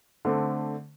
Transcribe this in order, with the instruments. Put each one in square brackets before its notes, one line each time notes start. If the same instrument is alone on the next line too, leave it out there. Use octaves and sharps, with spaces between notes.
[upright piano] D3 A3 C4